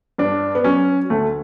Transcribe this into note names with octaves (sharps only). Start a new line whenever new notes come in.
G2 D4
B3
F#3 C#4
D2 A3